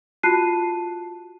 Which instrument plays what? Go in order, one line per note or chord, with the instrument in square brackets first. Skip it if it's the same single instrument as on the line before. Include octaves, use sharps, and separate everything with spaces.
[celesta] F4 F#4 A5 F#6 C7 D#7